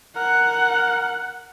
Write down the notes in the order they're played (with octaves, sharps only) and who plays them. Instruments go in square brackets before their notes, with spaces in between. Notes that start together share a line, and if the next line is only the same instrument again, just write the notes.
[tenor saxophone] A#4 [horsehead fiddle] F#5